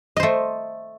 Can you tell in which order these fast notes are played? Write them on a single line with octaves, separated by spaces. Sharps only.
D#5 C5 A3